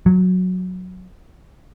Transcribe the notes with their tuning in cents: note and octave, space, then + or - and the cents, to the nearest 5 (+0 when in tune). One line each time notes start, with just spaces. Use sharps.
F#3 -10